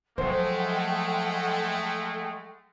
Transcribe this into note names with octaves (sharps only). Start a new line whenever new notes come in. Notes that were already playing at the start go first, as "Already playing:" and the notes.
F3 F#3 G#3 A3 A4 C5 F#5 G5